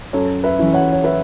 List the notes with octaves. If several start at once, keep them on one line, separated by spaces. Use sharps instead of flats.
F#2 A4 C#5
B4 E5
E3 C#4 E4
C#5 F#5
C#5
B4 E5